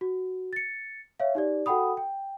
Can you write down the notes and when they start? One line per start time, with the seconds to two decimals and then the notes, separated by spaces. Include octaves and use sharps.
0.01 F#4
0.53 A6 C#7
1.20 C#5 E5 F5
1.35 D#4 G4 D5
1.66 F#4 A4 F#5 G5 B5 D#6
1.97 G5